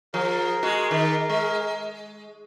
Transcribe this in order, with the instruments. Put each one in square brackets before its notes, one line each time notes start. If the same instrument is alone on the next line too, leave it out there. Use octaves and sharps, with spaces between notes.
[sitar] F3 [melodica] G#4 A#4
[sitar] G#3 F#4
D#3
G#3